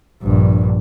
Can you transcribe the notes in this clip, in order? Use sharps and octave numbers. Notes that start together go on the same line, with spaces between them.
A#1 G2